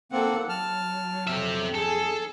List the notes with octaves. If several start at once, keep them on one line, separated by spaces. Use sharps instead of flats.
A#3 C4 A4 F#5
F#3 A5 F6
F2 C4 E5
G#4 A4